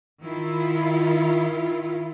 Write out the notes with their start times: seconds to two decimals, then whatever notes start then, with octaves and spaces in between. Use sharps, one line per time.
0.22 D#3 E4 F4